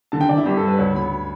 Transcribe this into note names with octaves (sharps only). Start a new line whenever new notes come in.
D3 A5
G5
D3 D5
E4
G2 G4
A4
G3
B4
D2 C#5
D2 B5